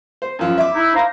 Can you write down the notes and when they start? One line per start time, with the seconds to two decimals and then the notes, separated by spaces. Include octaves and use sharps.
0.22 C5
0.39 F#2 F3
0.58 E5 D6
0.74 D#4 E4
0.95 C5 F5 A#5